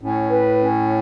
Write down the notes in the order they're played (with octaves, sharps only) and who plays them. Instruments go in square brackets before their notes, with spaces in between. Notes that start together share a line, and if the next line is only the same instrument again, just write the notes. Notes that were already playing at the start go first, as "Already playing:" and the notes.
[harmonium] A2 [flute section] C#4
[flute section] B4
C#4